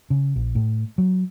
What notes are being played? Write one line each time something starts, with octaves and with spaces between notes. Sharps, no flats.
C#3
A#1
A2
F#3